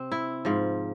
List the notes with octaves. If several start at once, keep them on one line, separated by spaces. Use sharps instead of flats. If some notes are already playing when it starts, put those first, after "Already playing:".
Already playing: C3 C4
E4
G#2 F3